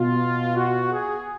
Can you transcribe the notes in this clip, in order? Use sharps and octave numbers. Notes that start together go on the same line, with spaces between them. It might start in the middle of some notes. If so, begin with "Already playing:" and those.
Already playing: B2 F4
F#4
G#4